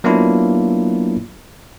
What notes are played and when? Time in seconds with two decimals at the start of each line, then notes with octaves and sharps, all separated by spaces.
0.04 F#3 A#3 B3 D4 E4 F4